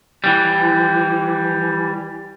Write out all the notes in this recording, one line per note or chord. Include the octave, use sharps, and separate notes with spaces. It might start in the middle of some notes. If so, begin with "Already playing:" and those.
E3 G3